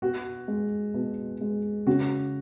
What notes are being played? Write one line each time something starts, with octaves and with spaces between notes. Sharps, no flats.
B2 F#4
G#3
B2
G#3
C#3 F#4